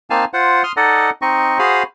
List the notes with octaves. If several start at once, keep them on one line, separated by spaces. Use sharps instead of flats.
A#3 C4 D#4 F5 G#5 A5
F4 C5 F#5
C6 D#6 F6
D#4 A4 D5 D#5 F#5
C4 D#4 D#5 C#6
F#4 G#4 C5 F5 B5 D#6